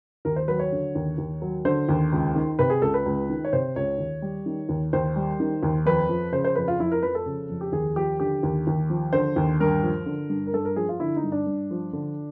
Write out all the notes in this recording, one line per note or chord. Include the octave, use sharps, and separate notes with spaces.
D#2 A#4
C5
F#3 B4
C#5
D3
D#2
D#2
F#3
D3 C5
D#2
C#2
D#3
C3 B4
G#4
C#2 A4
B4
C#2
D#3
C#5
C3 C5
C#2 C#5
D#2
G3
D#3
D#2
D#2 C5
G3
D#3
D#2
F2 B4
F3
C#3 C5
C5
F2 B4
F4
F2 E4
A#4
F3 B4
A4
C#3
F2
G4
D#2 G#4
F3 G4
D3 G4
D#2
D#2
F3
D3 C5
D#2
G2 A#4
F3
D3
G2
A#4
G2 A4
A#4
F3 G#4
F4
D3 E4
D#4
G2
D4
G2
F3
D3